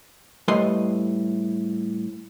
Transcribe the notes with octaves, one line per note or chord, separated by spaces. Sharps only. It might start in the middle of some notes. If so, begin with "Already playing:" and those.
A2 G3 B4 D#5 C6